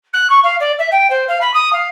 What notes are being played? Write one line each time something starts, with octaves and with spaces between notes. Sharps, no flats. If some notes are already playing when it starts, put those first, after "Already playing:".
F#6
C#6
F5
D5
E5
G5
C5
F5
B5
D#6
F5